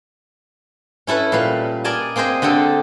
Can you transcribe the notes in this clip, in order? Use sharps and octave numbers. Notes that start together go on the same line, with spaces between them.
C#4 E4 A4 B4
A#2 G3 B4 F5
A#4 D5 D#5 G#5 A5
A#3 C4 G#4 C5 D#5
D3 C4 G4 A4